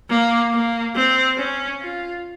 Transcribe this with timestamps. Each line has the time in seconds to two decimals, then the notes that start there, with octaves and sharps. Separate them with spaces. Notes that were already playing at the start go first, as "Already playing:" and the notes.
0.09 A#3
0.53 A#3
0.95 C4
1.38 C#4
1.81 F4